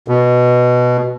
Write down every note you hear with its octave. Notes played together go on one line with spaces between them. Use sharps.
B2